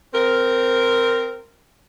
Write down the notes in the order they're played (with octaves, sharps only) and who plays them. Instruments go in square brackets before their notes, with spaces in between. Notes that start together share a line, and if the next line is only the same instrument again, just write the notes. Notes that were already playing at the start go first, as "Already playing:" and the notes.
[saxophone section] C4 A#4